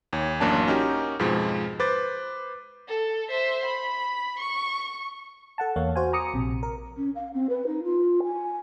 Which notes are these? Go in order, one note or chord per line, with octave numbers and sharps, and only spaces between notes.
D#2 C#5
A1 F#2 F#3 A#3 D4 A5
C#4 D#4 F#4 G4 A#4
F2 G#2 B2 F3 G#3
B4 C5 D6 A6
A4
C5 E5
B5
C#6
A4 F#5 A5
E2 A#3 C#5 F5
F#4 C5 F5 G#5
A#5 D6 D#6 C#7
A#1 C3
A#4
C#4
F5
C4
B4
D#4
F4
G#5